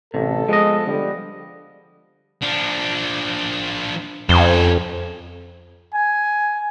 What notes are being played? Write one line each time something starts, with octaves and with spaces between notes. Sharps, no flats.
A1 C3 A4
F3 G#3 B3 D#5
D3 G3
F3 D4
F2 C#4 C5
G#5